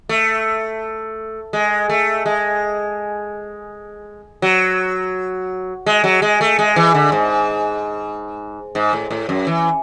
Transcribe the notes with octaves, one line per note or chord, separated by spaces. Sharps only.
A3
G#3
A3
G#3
F#3
G#3
F#3
G#3
A3
G#3
E3
D3
G#2
G#2
A2
A2
F#2
E3